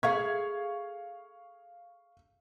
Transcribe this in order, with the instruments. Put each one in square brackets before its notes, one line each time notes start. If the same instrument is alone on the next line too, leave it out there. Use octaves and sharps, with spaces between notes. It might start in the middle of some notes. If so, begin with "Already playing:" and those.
[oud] G#4 A4 E5 [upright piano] F5 C#6 G#6